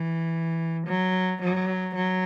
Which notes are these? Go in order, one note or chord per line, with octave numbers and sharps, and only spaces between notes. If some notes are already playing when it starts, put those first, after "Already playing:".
Already playing: E3
F#3
F#3
F#3